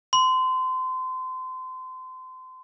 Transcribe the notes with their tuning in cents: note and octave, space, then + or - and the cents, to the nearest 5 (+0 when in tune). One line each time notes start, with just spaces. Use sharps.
C6 -30